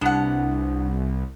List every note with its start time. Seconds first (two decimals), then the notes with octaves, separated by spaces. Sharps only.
0.01 C2 B3 D4 F#5